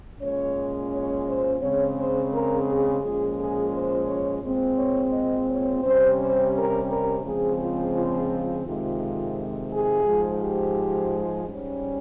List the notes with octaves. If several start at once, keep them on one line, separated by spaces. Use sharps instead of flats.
A#2 G#3 C#4 C#5
C#5
C5
C#3 G#3 C4 C#5
C5
A#4
G#4
A#2 F3 G#3 C#4 G#4
G#4
C5
C#5
A#2 G#3 C4
C#5
D#5
C#5
C3 G3 C#4 C5
C5
A#4
A#4
C#3 F3 G#3 C4 G#4
F4
F4
F2 C3 D#3 G#3 F4
G#4
G#2 F3 G#3
G4
G#2 G3 C#4